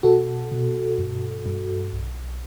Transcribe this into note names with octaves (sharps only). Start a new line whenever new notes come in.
B2 F#4 A4
B2
G2
G2
B1